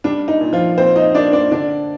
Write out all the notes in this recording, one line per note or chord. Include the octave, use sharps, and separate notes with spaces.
G3 D4
D#4
A#2
F3 F4
A#2 C4 C5
D#4 D#5
A#3 D4 D5
D4 D5
D3 D4 D5